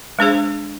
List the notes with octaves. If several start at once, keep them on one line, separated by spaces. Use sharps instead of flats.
G#3 D4 G#4 C5